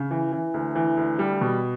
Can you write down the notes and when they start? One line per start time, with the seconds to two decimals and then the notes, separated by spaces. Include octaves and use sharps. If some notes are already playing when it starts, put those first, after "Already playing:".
Already playing: C#3
0.11 E3
0.32 E3
0.54 D2
0.75 E3
0.97 D2
1.19 G3
1.41 B2